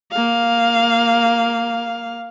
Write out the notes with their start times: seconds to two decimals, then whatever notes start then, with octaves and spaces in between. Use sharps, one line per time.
0.12 A#3 F5